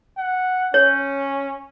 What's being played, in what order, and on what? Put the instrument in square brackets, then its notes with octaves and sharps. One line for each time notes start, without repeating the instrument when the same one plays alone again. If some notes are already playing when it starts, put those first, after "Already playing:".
[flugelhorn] F#5
[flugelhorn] C#4 [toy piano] C#5